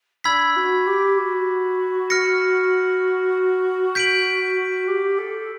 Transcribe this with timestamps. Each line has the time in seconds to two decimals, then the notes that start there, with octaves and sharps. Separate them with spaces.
0.24 D4 B5 E6 G#6 B6
0.56 F#4
0.86 G4
1.18 F#4
2.10 F6 A#6 C#7
3.95 G6 B6 D7 F#7
4.87 G4
5.18 A4